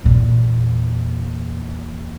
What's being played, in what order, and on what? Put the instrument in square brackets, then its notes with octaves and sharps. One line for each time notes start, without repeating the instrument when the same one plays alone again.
[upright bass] E2 A#2